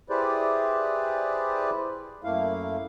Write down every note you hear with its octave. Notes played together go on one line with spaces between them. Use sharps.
E4 G4 G#4 B4 C5 D5
F#2 A3 A#3 E4 F5